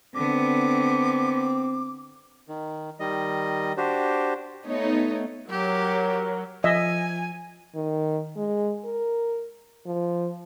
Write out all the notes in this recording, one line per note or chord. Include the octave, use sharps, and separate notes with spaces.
D3 B3 C4 D6
D#3
D#3 G3 D#5
D4 F#4 G4 C5
A3 B3 D#4 C#5
F#3 G4 A#4
F3 D#5 E5 G#5
D#3
G#3
A#4
F3